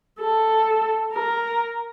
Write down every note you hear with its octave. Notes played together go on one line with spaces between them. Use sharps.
A4
A#4